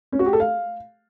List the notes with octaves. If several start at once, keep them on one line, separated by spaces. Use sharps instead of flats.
C#4
F#4
G4
A4
F5